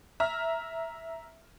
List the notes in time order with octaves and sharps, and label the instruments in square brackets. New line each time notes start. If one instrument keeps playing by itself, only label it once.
[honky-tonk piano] E5 A#5 F6